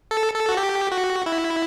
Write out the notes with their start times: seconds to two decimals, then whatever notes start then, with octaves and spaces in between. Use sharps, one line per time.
0.11 A4
0.34 A4
0.49 F#4
0.57 G4
0.92 F#4
1.26 E4